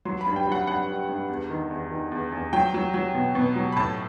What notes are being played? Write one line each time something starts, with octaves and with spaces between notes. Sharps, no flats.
F#3 C6
B5
G2
G5
F#3 F#5
G2 F#5
G2
G2
E2
D#3
E2
D#3
E2
E2
F#3 G5
F#3
F#3
B2
B2
F#3
B5
A2 A5